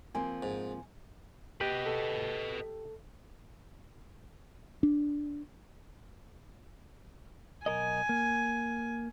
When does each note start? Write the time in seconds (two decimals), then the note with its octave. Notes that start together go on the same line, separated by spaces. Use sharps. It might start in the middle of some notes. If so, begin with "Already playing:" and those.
0.15 F3 A#3 C4 G#5
0.43 G#2
1.61 G4 B4 D#5
1.86 A4
4.83 D4
7.66 B1 A#4 D#5 G#5
8.09 A#3